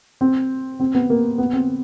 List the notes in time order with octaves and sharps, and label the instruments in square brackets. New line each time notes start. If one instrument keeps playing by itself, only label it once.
[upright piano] C4
C4
B3
A#3
B3
C4